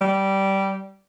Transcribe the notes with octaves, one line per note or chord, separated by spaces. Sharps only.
G3